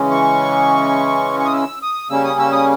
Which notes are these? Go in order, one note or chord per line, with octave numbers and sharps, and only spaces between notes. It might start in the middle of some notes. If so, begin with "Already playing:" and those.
Already playing: C#3 E3 G#3 C#4
C#6
C#6
D#6
E6
D#6
C#3 G3 A#3 C#4 E6
D#6
E6
D#6